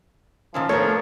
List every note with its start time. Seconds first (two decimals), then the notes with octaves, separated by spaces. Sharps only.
0.54 A#2 D#3 F3 C#4
0.69 A3 B3 D4 F4 A#4 C#5